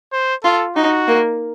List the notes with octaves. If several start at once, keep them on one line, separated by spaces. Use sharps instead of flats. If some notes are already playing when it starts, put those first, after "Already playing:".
C5
F4 A4
D#4 F#4
A#3